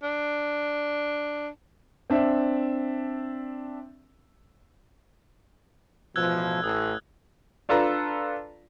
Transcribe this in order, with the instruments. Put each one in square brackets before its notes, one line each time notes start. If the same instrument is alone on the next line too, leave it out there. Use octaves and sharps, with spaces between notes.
[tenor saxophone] D4
[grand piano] C4 D4 E5
[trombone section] A1 B2 F3 [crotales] E6 F#6 G#6
[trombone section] A1 [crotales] D#6
[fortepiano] D4 F4 A4 B4 A#5